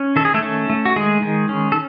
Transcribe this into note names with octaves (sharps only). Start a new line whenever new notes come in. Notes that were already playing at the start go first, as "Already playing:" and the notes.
Already playing: C#4
D#3 A4
G#4
A3 A4
C#4
A3
F#4
D#3 G#3 G#4
D#3
C#4
A4